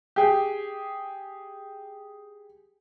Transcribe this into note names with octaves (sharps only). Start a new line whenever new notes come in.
G4 G#4